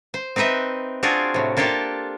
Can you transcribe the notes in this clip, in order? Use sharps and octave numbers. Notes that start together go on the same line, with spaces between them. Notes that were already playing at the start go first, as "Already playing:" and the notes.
C5
C4 D#4 B4 D#5 E5
C4 D4 F4 F#4 G#4
A2 C3
A#3 D4 F4 G4 A4